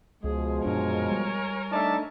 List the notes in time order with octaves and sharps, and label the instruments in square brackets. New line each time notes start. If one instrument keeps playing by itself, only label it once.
[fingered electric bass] C#2 [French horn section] B2 F3 G#3 [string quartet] G#4
[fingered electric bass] F#2 A#2 D4 [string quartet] A#4 C#5 G#5
[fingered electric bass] G3
[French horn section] A3 D4 D#4 [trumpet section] D5 E5 A5